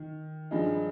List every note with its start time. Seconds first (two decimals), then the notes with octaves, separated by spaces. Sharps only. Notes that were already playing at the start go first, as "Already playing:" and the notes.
Already playing: D#3
0.51 G2 F3 G#3 D#4